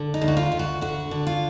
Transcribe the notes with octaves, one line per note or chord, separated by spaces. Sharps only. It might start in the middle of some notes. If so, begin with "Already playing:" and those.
Already playing: D3
D#4
D2
F#4
F4
D2
F#4
D3 F#4
D3
F4